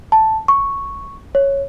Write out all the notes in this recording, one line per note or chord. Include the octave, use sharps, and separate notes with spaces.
A5
C#6
C#5